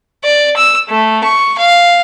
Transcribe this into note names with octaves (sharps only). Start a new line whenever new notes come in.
D5
E6
A3
C#6
F5